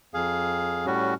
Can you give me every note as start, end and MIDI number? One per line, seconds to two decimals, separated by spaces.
0.14 0.86 41
0.14 0.86 68
0.14 0.86 77
0.86 1.14 45
0.86 1.14 55
0.86 1.14 61
0.86 1.14 66